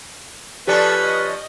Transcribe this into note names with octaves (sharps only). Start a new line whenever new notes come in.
F3 C#4 D4 G4 A4 B4
D#5